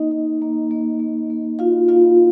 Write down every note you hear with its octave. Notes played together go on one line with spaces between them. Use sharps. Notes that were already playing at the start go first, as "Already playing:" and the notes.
Already playing: A#3 D#4 D#5
D#4
A#3
A#3
A#3
A#3
F4 F#4 F5
A#3 F4 F5